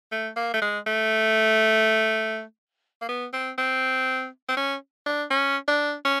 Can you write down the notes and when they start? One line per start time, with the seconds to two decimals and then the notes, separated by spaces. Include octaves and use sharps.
0.12 A3
0.36 A#3
0.54 A3
0.61 G#3
0.87 A3
3.01 A#3
3.09 B3
3.33 C4
3.58 C4
4.49 C4
4.57 C#4
5.06 D4
5.31 C#4
5.68 D4
6.05 C#4